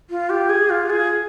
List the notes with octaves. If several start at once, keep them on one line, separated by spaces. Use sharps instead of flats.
F4
G4
G#4
F4
G#4